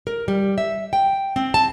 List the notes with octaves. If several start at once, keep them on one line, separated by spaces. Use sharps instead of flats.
A#4
G3
E5
G5
C4
A5